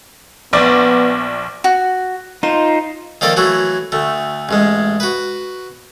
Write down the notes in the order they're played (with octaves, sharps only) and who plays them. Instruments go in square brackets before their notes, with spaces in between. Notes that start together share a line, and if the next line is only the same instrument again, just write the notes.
[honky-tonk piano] A#1 D5 [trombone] B3
[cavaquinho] F#4
[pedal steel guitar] D#4 F4 [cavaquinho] C5
[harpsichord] D#3 F3 A#3 A4 D5 D#5
E3 F#3 A3 F#4
D2 A3
A1 G#2 G#3
F#4 B4